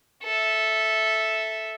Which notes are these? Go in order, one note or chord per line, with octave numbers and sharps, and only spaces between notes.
A4 E5